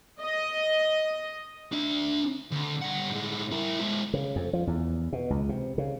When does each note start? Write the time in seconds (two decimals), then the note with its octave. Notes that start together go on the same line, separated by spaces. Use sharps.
0.21 D#5
1.73 D4 E5
2.51 D2
2.81 G3 F#5
3.09 A2 G#3
3.51 E4 A#4
3.80 G#3 E4
4.14 C#3
4.36 F2
4.53 F3
4.67 E2
5.13 B2
5.30 C#2
5.49 C3
5.78 C#3